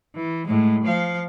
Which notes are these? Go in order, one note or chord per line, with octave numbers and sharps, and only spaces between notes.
E3
A2 G#3
F3 F5